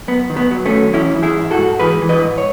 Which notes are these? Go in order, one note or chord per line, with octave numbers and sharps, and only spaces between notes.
F#2 B3
D#3
B3
F#3
A3 C#4
F#2
E3 C#4 E4
E3
E4 G#4
G#2
F#4 A4
G#2
E3 G#4 B4
E3
B4 D#5
G#2
C#5